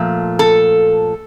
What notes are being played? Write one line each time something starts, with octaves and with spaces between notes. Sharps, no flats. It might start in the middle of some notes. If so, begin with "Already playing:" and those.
Already playing: A#2 F3 A3
A4